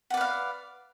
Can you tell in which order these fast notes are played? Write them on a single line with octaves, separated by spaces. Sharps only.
F#5 D5 B4 F5